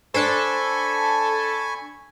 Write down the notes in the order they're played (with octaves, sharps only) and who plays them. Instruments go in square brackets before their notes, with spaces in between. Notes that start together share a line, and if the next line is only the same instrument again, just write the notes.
[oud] D4 C5 [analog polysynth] A4 [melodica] G#5 B5 C#6